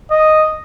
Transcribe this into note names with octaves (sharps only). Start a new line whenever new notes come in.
D#5